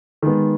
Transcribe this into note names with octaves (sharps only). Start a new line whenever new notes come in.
D#3 G#3 B3